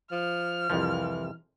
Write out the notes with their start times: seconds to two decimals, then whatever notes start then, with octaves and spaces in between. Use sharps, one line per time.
0.12 F3 F6
0.70 C2 F2 E3 F3